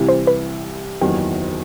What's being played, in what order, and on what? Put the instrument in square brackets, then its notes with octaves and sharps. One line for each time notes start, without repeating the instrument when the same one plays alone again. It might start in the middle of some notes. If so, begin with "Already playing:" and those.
Already playing: [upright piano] C2 C3 E3
[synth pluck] C5
B4
[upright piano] F#1 E2 D#3 F#3 [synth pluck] G4